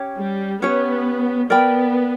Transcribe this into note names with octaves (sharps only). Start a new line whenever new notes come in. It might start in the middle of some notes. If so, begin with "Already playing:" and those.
Already playing: C#4 G4 C#5
G3
B3 C#4 G4 C#5
B3 A#4 D5 G5 B5